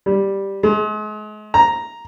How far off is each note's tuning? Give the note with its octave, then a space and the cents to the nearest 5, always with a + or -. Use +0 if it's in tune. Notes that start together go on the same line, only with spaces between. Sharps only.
G3 +0
G#3 +40
A#5 +0